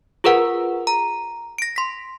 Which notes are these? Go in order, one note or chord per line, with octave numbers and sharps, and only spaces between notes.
F4 G#4 A#4 B4 F#5
A#5
A#6 D7
C6 B6